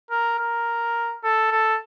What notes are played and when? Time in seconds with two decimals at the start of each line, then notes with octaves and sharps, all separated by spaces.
0.10 A#4
0.38 A#4
1.23 A4
1.51 A4